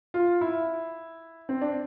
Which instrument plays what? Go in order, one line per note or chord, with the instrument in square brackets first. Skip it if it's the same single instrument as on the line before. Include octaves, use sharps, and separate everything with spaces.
[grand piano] F4
E4
C4
D4